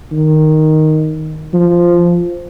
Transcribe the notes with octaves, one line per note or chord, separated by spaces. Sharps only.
D#3
F3